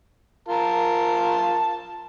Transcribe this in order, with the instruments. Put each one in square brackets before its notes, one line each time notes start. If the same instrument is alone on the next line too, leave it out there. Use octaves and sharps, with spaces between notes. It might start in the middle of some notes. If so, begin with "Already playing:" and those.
[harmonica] F4 A#4 A5